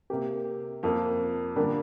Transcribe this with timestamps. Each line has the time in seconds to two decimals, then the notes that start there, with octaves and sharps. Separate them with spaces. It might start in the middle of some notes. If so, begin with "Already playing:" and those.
0.10 C3 A#3 G4
0.83 F2 F3 A#3
1.56 D3 G3 A#3 D4 A#4